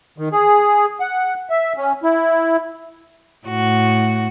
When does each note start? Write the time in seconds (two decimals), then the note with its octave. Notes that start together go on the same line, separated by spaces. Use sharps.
0.18 D#3
0.32 G#4
1.00 F#5
1.50 E5
1.77 C#4
2.03 E4
3.47 A2 F#4